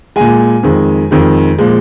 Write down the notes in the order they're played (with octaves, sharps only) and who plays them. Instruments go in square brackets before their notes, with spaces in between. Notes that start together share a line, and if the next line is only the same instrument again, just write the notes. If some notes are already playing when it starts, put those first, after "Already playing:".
[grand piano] A#2 G#3 G#5
F2 D#3 G#3
F2 D#3 G#3
A#2 F3 G#3